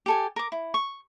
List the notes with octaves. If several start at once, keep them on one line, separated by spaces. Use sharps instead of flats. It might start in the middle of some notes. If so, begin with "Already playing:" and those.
G4 A4 G#5
A#4 D6
E4
C#6